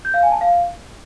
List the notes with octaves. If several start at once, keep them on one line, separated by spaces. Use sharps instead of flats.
G6
F5
G#5
A5
F5